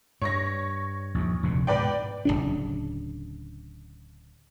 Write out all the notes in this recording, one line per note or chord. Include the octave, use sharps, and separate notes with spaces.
G2 C#5 C#6 A#6
A#1 D#2
F1 D2 A#2
G#2 B2 B4 D5 G5
D1 G1 C#3 D4